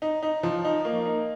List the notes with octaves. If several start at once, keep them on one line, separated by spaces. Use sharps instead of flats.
D#4
D#4
F3
D#4
A#3
D#4